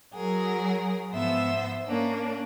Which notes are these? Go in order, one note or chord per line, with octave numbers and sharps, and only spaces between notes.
F#3 G#4 A#4
G#2 F3 B3 C5 E5 E6
A#3 C#4 D4